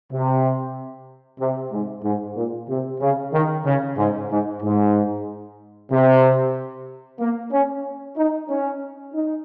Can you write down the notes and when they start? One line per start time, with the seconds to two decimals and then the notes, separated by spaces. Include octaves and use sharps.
0.11 C3
1.39 C3
1.72 G#2
2.03 G#2
2.35 A#2
2.69 C3
3.01 C#3
3.33 D#3
3.65 C#3
3.97 G#2
4.30 G#2
4.62 G#2
5.91 C3
7.20 A#3
7.51 C#4
8.16 D#4
8.49 C#4
9.14 D#4